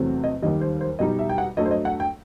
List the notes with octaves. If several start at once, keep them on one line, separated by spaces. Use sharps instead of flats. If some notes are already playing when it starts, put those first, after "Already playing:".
Already playing: E2 C3 F#3 A3 C4
D#5
D#2 D#3 G3 D#5
C5
C5
B2 G3 D#4 D#5
E5
G5
F#5
G2 F#3 A3 D#5
C5
D#5
F#5
G5